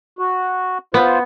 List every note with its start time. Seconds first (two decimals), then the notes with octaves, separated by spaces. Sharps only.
0.19 F#4
0.94 B3 F4 C5